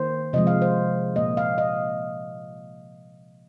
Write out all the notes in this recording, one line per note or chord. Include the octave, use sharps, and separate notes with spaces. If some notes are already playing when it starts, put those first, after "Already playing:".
Already playing: D#3 A#3 C5
C3 F3 G#3 D#5
F5
C5
A#2 A#3 D#5
F5
D#5